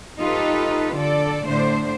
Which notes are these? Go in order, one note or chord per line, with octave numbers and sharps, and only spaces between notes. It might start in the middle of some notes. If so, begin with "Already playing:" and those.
D#4 F4 G4 A4 B4
D3 A4 D5
A2 D3 A3 D4 C5